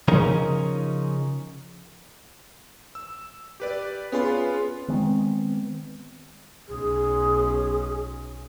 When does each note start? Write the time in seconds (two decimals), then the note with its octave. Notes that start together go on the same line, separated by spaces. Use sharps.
0.08 C#3 F3 C#4 D#4 G#4 A#4
2.95 E6
3.60 G4 B4 D5
4.12 B3 C#4 F4 G#4 B4 C6
4.88 D#3 G#3 B3 C4
6.69 B1 C#4 G#4